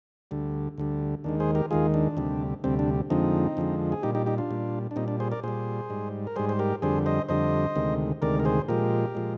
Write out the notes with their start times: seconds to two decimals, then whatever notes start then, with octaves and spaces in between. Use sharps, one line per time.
0.31 D2 D3 G3
0.78 D2 D3 G3
1.24 D#2 D#3 G#3 D4
1.40 G#4 C5
1.55 G4 A#4
1.71 D#2 D#3 G#3 F4 G#4
1.94 D4
2.17 D2 C3 G3
2.64 D2 C3 G3 C4
2.79 D4
3.10 F2 D3 F3 G#3 C4 D#4
3.57 F2 D3 F3 G#3
3.92 G#4
4.03 A#2 G3 D#4 G4
4.15 D#4 G4
4.26 D#4 G4
4.38 D4 F4
4.50 A#2 G3
4.91 D4
4.96 A#2 G3 C4 D#4
5.08 D4
5.20 G#4 C5
5.32 A#4 D5
5.43 A#2 G3 G#4 C5
5.90 G#2 G3
6.27 A#4
6.36 G#2 G3 G#4 C5
6.49 C5
6.59 G4 A#4
6.82 F2 D3 G3 G#4 C5
7.06 C5 D#5
7.29 F2 D3 G3 C5 D#5
7.75 D2 C3 D#3 G#3
8.22 D2 C3 D#3 G#3 A#4 D5
8.40 A#4
8.45 G#4 C5
8.68 A#2 F3 G#3 G4 A#4
9.15 A#2 F3 G#3